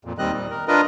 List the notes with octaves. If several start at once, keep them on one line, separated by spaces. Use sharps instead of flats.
F2 A#2
D#2 D#3 G3 C4 D#5 F#6
A#2 G3
A#4
D4 F4 A#4 B4 D#5